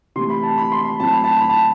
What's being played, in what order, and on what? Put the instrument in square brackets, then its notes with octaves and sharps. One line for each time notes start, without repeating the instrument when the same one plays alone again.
[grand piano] C3 E3 A3 C6
B5
A5
B5
C6
B5
A2 F#3 C4 A5
B5
A5
B5
A5